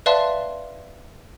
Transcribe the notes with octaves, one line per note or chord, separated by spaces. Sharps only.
B4 D5 E5 F5 A5 C6